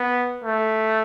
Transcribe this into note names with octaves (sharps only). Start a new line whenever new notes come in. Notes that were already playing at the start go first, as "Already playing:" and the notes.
Already playing: B3
A3